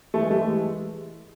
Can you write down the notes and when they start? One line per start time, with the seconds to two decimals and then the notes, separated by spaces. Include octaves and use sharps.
0.14 E3 A3
0.22 G#3
0.30 G3 A3
0.48 E3 G#3